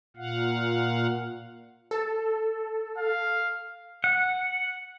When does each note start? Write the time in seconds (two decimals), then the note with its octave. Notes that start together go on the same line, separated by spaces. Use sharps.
0.16 A#2 F5 F#5
1.91 A4
2.98 F5
4.04 F#5